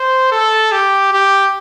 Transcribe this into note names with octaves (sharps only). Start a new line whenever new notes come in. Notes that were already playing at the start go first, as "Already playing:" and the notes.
Already playing: C5
A4
G4
G4